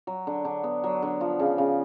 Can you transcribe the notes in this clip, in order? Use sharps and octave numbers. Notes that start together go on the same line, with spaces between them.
F#3
D3
D3
B3
F#3
D3
F3
C#3
C#3